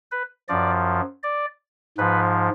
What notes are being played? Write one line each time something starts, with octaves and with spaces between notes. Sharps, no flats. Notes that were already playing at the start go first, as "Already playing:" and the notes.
B4
F#2 F3 D5
D5
G#2 F3 B4